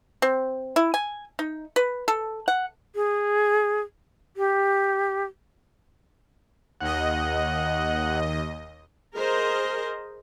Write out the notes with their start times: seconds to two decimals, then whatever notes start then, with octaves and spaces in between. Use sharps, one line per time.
0.22 C4
0.76 E4
0.94 G#5
1.39 D#4
1.76 B4
2.08 A4
2.48 F#5
2.95 G#4
4.37 G4
6.81 D#2 D#5 F#5
9.16 G#4 A#4 C5 D#5